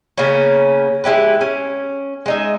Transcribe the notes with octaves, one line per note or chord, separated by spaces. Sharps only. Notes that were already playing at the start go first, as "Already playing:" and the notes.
C#3 A#3 B3 C#4
G#3 E4 G4 B4
C#4
G#3 D#4 E5